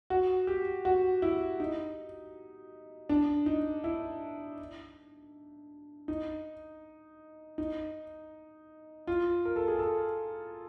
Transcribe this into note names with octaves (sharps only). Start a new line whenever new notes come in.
F#4
G4
F#4
E4
D#4
D4
D#4
E4
D#4
D#4
F4
A#4
A4
G#4
A4